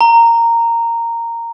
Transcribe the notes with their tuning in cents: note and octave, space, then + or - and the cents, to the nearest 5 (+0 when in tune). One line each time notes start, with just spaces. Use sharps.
A#5 -10